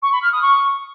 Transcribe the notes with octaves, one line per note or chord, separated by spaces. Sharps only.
C#6
B5
F6
D#6
C#6